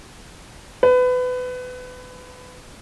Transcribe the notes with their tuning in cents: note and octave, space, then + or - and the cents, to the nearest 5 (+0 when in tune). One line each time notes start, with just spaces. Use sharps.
B4 +25